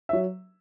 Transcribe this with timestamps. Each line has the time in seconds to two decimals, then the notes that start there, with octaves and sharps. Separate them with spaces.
0.09 E5
0.13 F#3